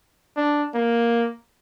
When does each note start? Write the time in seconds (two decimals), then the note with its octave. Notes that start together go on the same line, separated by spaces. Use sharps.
0.37 D4
0.75 A#3